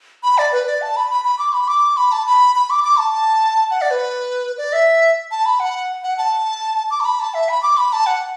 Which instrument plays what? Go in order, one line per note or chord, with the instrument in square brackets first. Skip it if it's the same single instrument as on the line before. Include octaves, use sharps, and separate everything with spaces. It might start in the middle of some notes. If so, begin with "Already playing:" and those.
[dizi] B5
D5
B4
D5
A5
B5
B5
B5
D6
B5
D6
B5
A5
B5
B5
D6
D6
A5
F#5
D5
B4
D5
E5
A5
B5
F#5
F#5
A5
D6
A5
B5
A5
E5
B5
D6
B5
A5
F#5